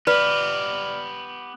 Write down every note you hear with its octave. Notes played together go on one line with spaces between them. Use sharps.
B3 G4 B4 D5 F6